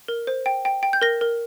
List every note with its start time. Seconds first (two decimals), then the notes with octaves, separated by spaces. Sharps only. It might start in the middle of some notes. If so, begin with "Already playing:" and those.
0.08 A#4
0.27 C5
0.46 G5
0.65 G5
0.83 G5
0.93 G6
1.02 A#4 A#6
1.21 A#4